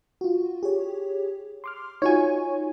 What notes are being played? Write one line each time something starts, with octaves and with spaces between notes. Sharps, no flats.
F4 F#4
G4 G#4 C#5
C6 D6 F6
D#4 F4 F#4 C#5 G#5